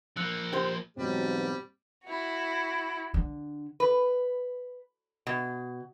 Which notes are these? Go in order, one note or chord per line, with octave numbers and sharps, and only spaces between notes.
F3 A#3 E6 F#6 C#7
G4 C5
G#2 B2 E3 F#3 G3 C4 F#4
E4 F#4
D3
B4
B2